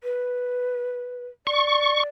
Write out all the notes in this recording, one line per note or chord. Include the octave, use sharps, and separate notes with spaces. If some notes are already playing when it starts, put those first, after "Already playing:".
B4
D5 C#6